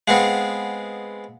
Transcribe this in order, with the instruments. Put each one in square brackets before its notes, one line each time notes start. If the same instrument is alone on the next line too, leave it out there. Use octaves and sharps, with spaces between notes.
[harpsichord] G#3 B3 C4 [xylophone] F5 F#5